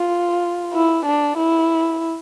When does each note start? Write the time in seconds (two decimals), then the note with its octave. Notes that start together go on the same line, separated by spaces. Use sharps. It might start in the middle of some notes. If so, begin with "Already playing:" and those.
Already playing: F4
0.73 E4
1.05 D4
1.37 E4